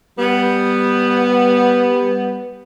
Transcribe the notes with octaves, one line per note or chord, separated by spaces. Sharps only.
G3 B3